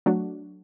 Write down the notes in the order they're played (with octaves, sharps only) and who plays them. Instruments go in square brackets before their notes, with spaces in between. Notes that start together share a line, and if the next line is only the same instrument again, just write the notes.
[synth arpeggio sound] F#3 A3 D4 F#4